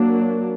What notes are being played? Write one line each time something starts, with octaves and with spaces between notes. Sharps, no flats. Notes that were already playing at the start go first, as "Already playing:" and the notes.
Already playing: F#3 A#3 D4